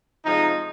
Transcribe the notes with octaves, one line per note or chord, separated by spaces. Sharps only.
C3 F3 G#3 D#4